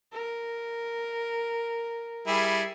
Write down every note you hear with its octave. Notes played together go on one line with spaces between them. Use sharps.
A#4
G3 E4 G#4